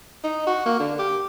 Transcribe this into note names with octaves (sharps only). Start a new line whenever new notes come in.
D#4
F#4
A#3
D3
G4